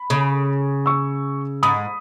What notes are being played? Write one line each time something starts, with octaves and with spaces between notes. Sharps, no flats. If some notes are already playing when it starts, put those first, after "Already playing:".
Already playing: B5
C#3
C#6 E6
G#2 B5 D#6